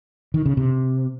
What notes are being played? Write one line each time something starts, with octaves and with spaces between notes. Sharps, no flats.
D#3
C#3
C3